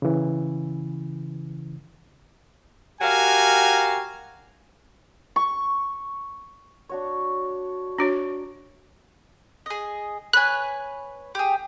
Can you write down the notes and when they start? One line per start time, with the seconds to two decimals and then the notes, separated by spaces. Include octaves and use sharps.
0.02 C#3 E3
3.01 F#4 G4 A#4 F5 G#5
5.36 C#6
6.89 D4 F#4 C#5
7.98 D4 F#4 C#5
9.66 G#4 D#5
10.33 B4 C#5 G#5 F#6
11.35 G4 G#4